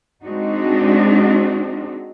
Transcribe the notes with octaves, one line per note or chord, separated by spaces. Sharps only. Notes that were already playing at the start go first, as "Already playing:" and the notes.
G#3 C4 D4 D#4 F#4